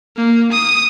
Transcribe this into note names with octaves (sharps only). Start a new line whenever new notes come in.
A#3
D#6